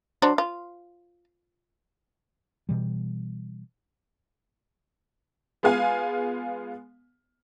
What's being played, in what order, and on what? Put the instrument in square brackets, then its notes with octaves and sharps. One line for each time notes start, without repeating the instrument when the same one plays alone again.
[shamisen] F#3 D4 C5
F4
[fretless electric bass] B2 E3 G3
[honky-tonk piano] G#3 B3 F4 F5 G#5